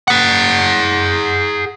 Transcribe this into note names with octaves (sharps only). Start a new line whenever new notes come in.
G#4 F#5